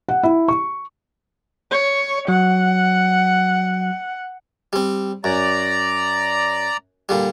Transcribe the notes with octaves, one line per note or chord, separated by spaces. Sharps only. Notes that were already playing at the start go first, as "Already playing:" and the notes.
F#5
E4
C#6
C#5
F#3 F#5
G3 C4
F#2 D5 A#5
A#2 D3 G3